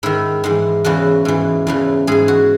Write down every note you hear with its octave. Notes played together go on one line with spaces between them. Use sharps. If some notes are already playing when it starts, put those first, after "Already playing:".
G#2 D#3 E4
G#2 E3
E2 C#3 E3 F#4
G#2 E3
E2 C#3 E3
G#2 E3 G#4
F#4